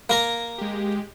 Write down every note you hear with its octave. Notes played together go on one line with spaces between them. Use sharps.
A#3 A#4 A#5
G#3 G4